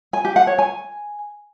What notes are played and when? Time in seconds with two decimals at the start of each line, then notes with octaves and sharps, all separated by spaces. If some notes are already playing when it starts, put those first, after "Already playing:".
0.13 G#5
0.25 G4
0.36 F#5
0.47 C#5
0.58 G#5